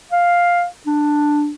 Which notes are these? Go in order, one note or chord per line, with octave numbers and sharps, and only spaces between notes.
F5
D4